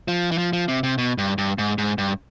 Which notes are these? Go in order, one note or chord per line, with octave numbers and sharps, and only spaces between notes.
F3
E3
F3
F3
C3
C3
B2
G2
G2
G#2
G#2
G2